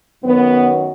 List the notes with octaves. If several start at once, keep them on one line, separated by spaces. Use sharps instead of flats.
F#2 D#3 F#3 B3